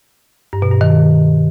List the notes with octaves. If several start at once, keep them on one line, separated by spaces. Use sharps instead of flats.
G2
B2
G2
D#3